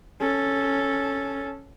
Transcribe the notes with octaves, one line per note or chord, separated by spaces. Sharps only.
C#4 A4